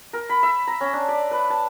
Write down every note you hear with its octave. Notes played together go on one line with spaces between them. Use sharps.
A#4
B5
E5
A#5
C#4
D4
D5
B4
A5